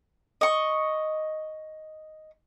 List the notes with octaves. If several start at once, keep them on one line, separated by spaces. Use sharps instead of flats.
D#5 C#6